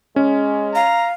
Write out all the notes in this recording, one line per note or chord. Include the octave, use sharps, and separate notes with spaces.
G#3 C#4
F5 A#5